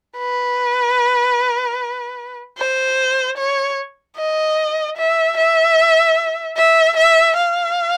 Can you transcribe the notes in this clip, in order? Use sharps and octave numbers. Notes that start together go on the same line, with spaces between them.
B4
C5
C#5
D#5
E5
E5
E5
E5
F5